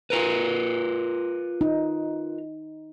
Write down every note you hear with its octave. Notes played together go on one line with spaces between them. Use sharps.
F4 A#4 B4
D#4